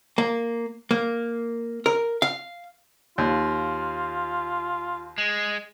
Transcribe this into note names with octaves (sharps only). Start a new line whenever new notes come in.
A#3
A#3
A#4
F5
D#2 F4
G#3